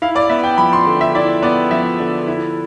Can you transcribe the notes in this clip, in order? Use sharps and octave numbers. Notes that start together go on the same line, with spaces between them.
E4 F5
D5
B3 E5
G5
F3 B5
C6
D3
E5
E4 D5
B3 D5
F3 E5
D3
E4